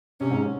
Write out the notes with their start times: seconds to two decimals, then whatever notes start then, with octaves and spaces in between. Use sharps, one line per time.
0.20 C3 C#4
0.30 G#2